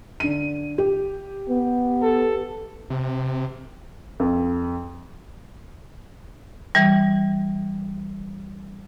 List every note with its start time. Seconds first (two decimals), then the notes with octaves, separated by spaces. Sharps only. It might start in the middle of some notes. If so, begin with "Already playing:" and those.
0.20 D3 D#7
0.78 G4
1.49 B3
2.02 A4
2.90 C3
4.20 F2
6.75 E3 G3